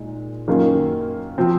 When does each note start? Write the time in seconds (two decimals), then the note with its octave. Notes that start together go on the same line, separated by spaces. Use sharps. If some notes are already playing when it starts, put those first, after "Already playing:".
Already playing: A#2 G#3 D#4
0.48 F#2 D#3 A#3 C#4 F4
1.38 F3 C4